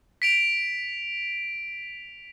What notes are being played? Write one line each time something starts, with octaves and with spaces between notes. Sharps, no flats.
B6 D7 F7